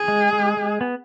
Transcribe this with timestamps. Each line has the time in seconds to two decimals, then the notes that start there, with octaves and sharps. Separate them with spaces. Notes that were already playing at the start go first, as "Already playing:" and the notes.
Already playing: G#4
0.08 G#3
0.33 G#3
0.57 G#3
0.81 B3